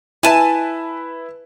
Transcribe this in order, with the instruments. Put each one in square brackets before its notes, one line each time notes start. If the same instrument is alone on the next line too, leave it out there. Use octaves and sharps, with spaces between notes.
[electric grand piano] E4 B4 E5 [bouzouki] G#5 A5